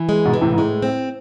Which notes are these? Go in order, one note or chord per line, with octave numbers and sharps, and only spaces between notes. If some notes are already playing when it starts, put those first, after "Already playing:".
Already playing: E3
G#3
G#2 B2
E3
A2 C3
G#2
A2 G#3
C4